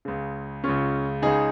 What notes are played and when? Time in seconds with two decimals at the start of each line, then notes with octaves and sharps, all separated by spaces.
0.05 C#2 C#3
0.64 C#2 C#3 C#4 F4
1.22 C#2 C#3 D#4 G#4